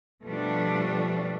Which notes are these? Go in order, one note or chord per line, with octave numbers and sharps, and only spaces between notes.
B2 F3 G3 A3 D4